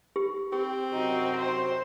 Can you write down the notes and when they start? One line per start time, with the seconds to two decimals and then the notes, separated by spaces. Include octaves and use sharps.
0.16 G4
0.52 C4 G4
0.93 F#2 C3 D#4 F#4
1.36 C5